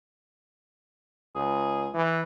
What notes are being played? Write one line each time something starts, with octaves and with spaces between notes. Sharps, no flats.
C#2 G#4
E3